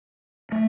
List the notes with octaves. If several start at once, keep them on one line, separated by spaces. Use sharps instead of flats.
A3